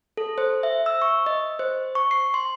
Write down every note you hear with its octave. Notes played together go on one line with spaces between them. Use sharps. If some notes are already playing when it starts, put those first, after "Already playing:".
A4
C5
E5
E6
C#6
D#5
C5
C#6
C7
C6